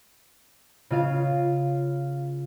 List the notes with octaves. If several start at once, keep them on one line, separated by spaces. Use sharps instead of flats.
C#3 F4 F5